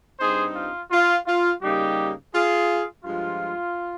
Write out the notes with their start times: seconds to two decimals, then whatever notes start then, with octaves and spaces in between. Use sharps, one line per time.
0.20 G2 G3 C4 D#4 G#4 C5
0.55 F4
0.91 F4
1.26 F4
1.62 C#3 G3 A#3 D#4 G4
2.33 F4 G#4
3.04 G2 F3 G#3 F4